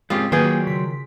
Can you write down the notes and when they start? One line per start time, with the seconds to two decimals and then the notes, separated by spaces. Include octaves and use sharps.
0.10 G#3 C4 C#4 F4 G4 D#6
0.32 D#3 F#3 A#3 F4 G#4 B4 G5 G#5
0.67 C#3 C6 B6